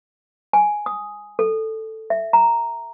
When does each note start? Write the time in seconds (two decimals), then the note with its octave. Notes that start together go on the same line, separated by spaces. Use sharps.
0.53 G#5
0.86 D#6
1.39 A4
2.10 E5
2.33 A#5